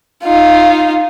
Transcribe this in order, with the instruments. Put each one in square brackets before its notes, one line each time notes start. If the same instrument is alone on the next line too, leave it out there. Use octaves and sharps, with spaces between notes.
[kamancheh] D#4 F4